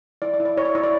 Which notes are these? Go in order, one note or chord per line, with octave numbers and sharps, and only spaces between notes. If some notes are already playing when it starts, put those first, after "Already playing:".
E4 D5
D5
E4
D5
E4 C#5
D5
E4 C#5
D5